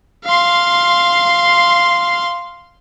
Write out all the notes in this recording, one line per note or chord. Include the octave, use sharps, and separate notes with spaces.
F5 C6